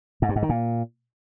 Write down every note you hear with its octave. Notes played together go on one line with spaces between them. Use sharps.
G#2
G2
G#2
D#3
A#2